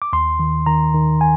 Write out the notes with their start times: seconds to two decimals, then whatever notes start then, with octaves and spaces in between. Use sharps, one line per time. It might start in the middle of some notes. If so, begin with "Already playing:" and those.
0.02 D6
0.13 D#2 C6
0.39 D#3
0.66 D#3 A#5
0.94 D#3
1.21 G#5